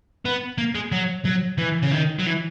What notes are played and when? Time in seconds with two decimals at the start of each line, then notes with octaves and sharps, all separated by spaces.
0.25 B3
0.58 A#3
0.75 G#3
0.92 F#3
1.25 F#3
1.58 E3
1.83 C#3
1.92 D#3
2.19 F#3
2.26 E3